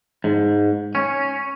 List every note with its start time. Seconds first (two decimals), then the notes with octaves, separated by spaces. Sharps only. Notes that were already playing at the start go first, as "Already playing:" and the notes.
0.24 G#2
0.95 C#4